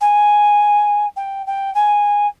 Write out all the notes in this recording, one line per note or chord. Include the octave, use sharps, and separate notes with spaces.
G#5
G5
G5
G#5